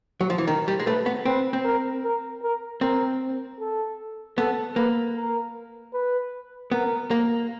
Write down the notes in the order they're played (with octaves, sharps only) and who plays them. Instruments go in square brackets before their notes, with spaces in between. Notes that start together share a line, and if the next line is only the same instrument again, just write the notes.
[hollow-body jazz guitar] F#3
F3
E3
[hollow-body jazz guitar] D#3 [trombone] A#4
[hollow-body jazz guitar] G3
G#3
[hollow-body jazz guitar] A3 [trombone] B4
[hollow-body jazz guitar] B3
[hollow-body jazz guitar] C4 [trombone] B4
[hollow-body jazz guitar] C4
[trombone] A#4
A#4
A#4
[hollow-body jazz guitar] C4 [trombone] A#4
[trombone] A4
[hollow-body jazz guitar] B3 [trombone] A4
[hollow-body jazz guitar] A#3 [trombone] B4
[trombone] A#4
B4
[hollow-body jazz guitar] B3 [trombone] A#4
[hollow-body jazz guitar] A#3